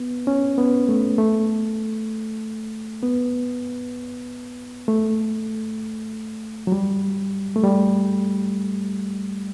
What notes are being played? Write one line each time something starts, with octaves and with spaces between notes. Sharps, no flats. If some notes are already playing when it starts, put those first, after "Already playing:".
Already playing: B3
C#4
B3
A3
A3
B3
A3
F#3
G3
A3
G3